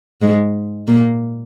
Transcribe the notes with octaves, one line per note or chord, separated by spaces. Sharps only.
G#2 G#3
A#2 A#3